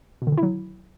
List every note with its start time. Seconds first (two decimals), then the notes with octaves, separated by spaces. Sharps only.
0.22 B2
0.27 D3
0.32 D#3
0.38 E4
0.43 F#3